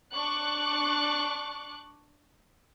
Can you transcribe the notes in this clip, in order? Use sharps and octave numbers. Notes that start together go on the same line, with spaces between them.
D4 C#6 D6 F#6